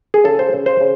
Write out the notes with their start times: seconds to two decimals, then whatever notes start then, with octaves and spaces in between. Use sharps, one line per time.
0.14 G#4
0.24 C#3 A4
0.39 C5
0.53 C#3
0.66 C5
0.81 C#3